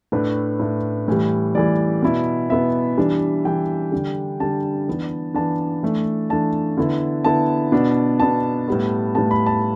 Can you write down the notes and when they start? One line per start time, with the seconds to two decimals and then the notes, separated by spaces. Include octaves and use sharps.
0.12 A2 A3 D4 B4
0.59 A2 A3 D4
1.08 A2 E3 G3
1.55 A2 E3 G3 D5
2.02 B2 B3 E4
2.49 B2 B3 E4 E5
2.98 E3 G3 D4
3.45 E3 G3 D4 G5
3.92 D3 G3 D4
4.40 D3 G3 D4 A5
4.88 E3 B3 D4
5.34 E3 B3 D4 A5
5.83 E3 A3 D4
6.30 E3 A3 D4 A5
6.77 D3 B3 E4
7.24 D3 B3 E4 A5
7.72 B2 B3 D4
8.20 B2 B3 D4 A5
8.68 A2 G3 B3
9.15 A2 G3 B3 A5
9.31 B5
9.46 A5